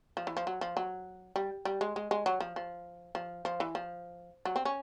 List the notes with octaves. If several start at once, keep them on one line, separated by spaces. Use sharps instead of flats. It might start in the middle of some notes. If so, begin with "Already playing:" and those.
F3
E3
F3
F#3
F3
F#3
G3
G3
G#3
G#3
G#3
F#3
F3
F3
F3
F3
E3
F3
F#3
C4
C#4